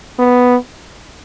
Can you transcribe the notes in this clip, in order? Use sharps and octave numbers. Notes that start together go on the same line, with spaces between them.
B3